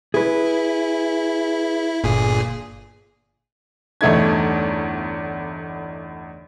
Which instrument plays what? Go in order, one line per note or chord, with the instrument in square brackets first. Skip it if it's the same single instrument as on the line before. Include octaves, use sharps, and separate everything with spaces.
[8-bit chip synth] E4 [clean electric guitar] G#4 B4
[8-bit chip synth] G1 A#2 G#4
[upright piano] G1 E2 A3 D#4 G#6